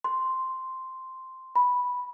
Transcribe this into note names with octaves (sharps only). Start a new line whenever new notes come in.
C6
B5